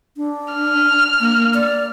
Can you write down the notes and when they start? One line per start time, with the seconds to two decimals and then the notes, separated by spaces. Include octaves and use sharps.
0.17 D4
0.54 F6
1.20 A#3
1.54 D5